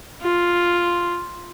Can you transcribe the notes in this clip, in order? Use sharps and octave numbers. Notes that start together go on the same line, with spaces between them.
F4